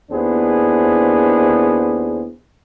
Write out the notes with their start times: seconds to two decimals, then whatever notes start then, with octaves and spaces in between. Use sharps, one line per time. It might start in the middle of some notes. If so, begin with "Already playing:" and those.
0.11 D#2 B3 D4 E4 G#4 C5